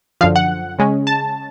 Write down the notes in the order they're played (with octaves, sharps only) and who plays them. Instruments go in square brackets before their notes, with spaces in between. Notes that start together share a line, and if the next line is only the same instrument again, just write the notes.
[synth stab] F#2 D3 F3 F5
F#5
C#3 G#3 C#4
A5